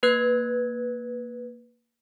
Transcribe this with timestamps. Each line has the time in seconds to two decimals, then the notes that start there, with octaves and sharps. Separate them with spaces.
0.03 A#3 B4 F#6 G#6